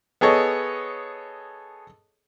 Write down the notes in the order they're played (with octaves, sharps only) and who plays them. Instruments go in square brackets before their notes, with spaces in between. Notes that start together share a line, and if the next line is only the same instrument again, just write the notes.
[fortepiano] B3 G#4 A4 C#5 D#5